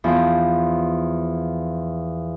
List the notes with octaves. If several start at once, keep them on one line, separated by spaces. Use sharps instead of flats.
E2 F3